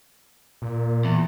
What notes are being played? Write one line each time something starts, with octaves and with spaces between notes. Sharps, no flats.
A#2
E2